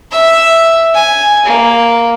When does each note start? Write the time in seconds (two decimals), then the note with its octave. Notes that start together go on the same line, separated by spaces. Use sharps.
0.11 E5
0.94 G#5
1.46 A#3